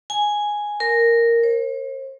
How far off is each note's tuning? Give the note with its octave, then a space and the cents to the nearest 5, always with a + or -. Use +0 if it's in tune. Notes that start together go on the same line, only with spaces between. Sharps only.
G#5 +0
A#4 -5
C5 +45